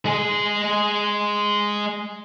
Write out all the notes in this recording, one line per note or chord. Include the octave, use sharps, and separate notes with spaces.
G#3 G#4